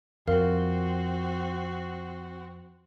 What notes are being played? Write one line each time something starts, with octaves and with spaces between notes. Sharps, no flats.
F2 C4 F#4 A#4 F5